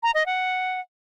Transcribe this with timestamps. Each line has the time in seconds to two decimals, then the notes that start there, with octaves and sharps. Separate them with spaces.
0.03 A#5
0.14 D#5
0.26 F#5